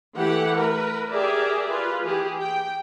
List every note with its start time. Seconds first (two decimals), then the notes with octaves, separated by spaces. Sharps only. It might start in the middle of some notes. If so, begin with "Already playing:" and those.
0.16 E3 A3 G4 F#5
0.54 A#4 B4
1.10 G4 G#4 A#4 D5 E5
1.70 F4 B4
2.05 E3 G4 G#4
2.40 G5